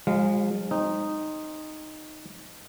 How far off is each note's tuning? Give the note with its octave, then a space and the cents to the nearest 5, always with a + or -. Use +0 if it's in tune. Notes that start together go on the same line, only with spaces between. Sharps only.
F3 +35 G#3 -30 F5 +0
C4 +25 D#4 -10